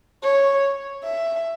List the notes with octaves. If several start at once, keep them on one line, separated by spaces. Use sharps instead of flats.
C#5
E5